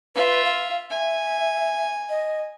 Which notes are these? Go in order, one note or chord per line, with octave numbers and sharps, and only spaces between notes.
F4 B4 E5
F5
E5 G#5
D#5